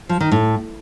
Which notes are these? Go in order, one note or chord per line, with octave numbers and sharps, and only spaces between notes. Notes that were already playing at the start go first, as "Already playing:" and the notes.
F3
D#3
A2